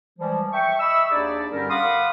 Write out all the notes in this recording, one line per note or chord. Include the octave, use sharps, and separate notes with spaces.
E3 F3 G3 G#3
E5 G5 C#6
D#5 E5 B5 C#6 E6
D#2 D4 D#4 G#4 D5
G2 D3 G3 C#4 G4 A#4
F5 F#5 B5 C6 D6 D#6